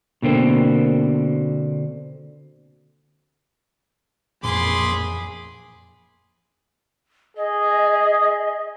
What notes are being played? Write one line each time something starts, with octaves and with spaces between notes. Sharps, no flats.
B2 D3 A#3 C4
A1 F2 A#2 F3 G#4 B5 C6 D6
G#4 D#5